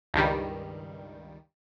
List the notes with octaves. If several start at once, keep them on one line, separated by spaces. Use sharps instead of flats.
C#2 G2 D#3 G3